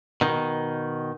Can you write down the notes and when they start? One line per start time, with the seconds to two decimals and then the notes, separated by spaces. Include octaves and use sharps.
0.21 B2 D#3